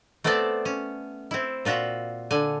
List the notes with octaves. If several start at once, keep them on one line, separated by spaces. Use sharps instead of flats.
A3 B3 C4 A4 D5 A5
C#4
C4 E4
A#2 F4 F#4 E5
D3 G#5